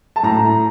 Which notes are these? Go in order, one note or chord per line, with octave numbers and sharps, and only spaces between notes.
A5
A2 A#5